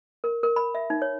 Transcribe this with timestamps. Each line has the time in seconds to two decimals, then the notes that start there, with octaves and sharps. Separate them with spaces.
0.24 A#4
0.43 A#4
0.56 B5
0.75 E5
0.90 D#4
1.02 C#5